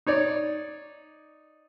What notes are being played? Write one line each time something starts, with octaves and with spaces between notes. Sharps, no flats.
D#4 C#5 D5